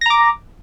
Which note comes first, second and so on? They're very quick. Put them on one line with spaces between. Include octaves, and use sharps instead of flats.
A#6 A#5 D6